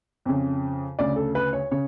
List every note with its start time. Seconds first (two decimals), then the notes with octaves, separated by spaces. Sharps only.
0.25 F2 C#3
0.99 D2 C#3 D5
1.16 A4
1.35 B4
1.53 C#5
1.71 C#3 C#5